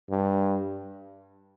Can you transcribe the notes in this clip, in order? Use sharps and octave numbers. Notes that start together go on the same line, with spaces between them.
G2